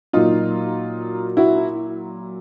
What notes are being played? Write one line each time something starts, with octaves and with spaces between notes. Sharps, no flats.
A#2 F#3 D#4 F4
E4 F#4